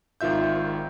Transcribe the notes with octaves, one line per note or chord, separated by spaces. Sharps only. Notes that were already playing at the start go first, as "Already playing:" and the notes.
G#1 D#3 F4 E5 G6